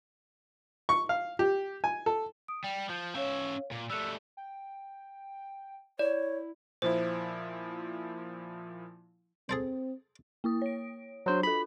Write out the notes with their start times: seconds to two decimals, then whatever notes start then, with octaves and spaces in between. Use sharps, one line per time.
0.89 C#6
1.09 F5
1.39 G4
1.84 G#5
2.06 A4
2.48 D#6 D7
2.64 G3 G5
2.90 F3 G6
3.15 C#4 C#5 E5 F5
3.71 A#2
3.90 G3 A3 E6 F#6 C#7
4.37 G5
5.99 E4 C#5 D5
6.82 A#2 F3 E4 C5
9.49 C4 G#4 A4 C5
10.44 A#3 E4 D#6
10.62 C#5 D7
11.26 F#3 D4 F#4 C5
11.43 F4 A4 B5